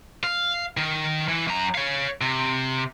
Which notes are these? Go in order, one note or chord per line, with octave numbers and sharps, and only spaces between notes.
F5
D#3
E3
F#2 A#5
C#5 F5
C3